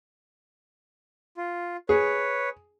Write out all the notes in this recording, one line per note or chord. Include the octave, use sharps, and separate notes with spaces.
F4
G#4 B4 C#5